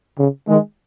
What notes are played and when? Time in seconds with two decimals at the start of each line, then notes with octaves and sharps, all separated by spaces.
0.19 C#3
0.48 D#3 G#3